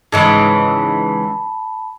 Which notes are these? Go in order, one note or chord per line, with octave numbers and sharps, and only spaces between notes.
G#2 C#3 E3 A5 B5